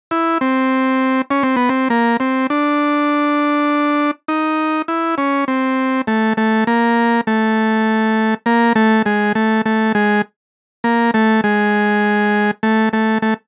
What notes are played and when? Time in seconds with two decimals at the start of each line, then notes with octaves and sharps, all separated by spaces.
0.11 E4
0.41 C4
1.31 C#4
1.43 C4
1.56 B3
1.69 C4
1.90 A#3
2.20 C4
2.50 D4
4.28 D#4
4.88 E4
5.18 C#4
5.48 C4
6.07 A3
6.37 A3
6.67 A#3
7.27 A3
8.46 A#3
8.75 A3
9.06 G#3
9.35 A3
9.66 A3
9.95 G#3
10.84 A#3
11.14 A3
11.44 G#3
12.63 A3
12.93 A3
13.22 A3